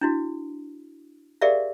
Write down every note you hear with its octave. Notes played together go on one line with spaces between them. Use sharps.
D4 E4 F#4
G4 G#4 A#4 D5 E5 F5